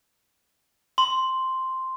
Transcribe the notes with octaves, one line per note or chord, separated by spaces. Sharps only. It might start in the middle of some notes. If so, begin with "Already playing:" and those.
C6